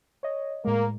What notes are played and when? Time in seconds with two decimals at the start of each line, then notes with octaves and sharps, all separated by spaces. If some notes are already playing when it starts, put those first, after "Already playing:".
0.23 C#5 D#5
0.65 A2 G#3 A#3